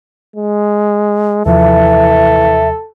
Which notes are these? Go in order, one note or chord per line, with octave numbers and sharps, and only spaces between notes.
G#3
D#2 C3 E3 F3 A4 E5